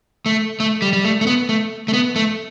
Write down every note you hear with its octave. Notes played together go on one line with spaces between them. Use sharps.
A3
A3
G3
G3
A3
A3
B3
A3
A3
B3
A3